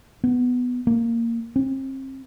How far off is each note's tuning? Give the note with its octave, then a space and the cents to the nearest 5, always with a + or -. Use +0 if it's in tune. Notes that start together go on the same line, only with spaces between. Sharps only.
B3 +5
A#3 -10
C4 +35